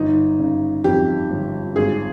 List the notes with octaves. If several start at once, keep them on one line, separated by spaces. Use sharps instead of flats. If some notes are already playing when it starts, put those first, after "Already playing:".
Already playing: G1 D#4
C#3
F2 G4
G1
G#1 G#4